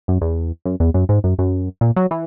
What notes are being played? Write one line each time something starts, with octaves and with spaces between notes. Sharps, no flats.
F#2
E2
F#2
E2
F#2
G#2
F#2
F#2
A#2
F#3
E3